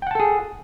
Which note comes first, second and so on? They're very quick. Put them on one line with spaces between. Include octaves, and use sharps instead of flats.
G5 F#5 A5 A4 G#4